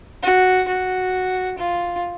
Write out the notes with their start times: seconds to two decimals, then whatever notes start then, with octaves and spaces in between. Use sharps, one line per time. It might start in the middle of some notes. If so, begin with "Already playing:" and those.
0.23 F#4
0.67 F#4
1.58 F4